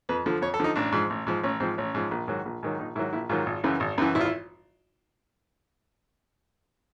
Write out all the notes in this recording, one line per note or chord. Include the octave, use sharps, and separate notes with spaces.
F2 B4
D3 F3
F2 C#5
A4
D3 F3 D#4
A1 D4
G#2 F3
A1
G#2 F3
A1 C#4
G#2 F3 C4
A1 C#4
G#2 F3
A#1
G#2 D#3 F#3
A#1
G#2 D#3 F#3
A#1 D#4
G#2 D#3 F#3 E4
A#1 E4
G#2 D#3 F#3 F4
G#1
F#2 C#3 E3
G#1
F#2 C#3 E3
G#1 E4
F4
E4